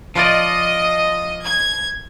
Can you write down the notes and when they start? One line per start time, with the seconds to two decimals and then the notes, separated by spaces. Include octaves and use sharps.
0.16 F3 F4 D5 D#5
1.43 G#6